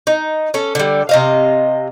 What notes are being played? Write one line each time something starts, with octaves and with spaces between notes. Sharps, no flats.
D#4
C#4 A4
D3 G3
C3 D#5 F5